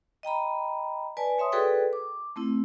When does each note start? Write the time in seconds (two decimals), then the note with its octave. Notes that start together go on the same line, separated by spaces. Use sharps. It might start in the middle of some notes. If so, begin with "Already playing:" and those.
0.23 D#5 G5 A#5 B5
1.17 B4 D5 G#5 A5
1.38 C#5 E5 C6 D#6
1.52 F#4 G#4 A4 B4 D5 G5
1.93 D6
2.36 A3 C4 E4